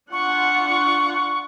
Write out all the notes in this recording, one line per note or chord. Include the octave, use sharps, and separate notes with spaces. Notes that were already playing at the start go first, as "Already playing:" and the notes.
D4 F4 F#5 C#6